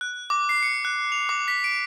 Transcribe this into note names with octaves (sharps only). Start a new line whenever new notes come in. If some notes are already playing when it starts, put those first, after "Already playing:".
F#6
D6
C7
C#7
F#6
F7
D6
B6
D7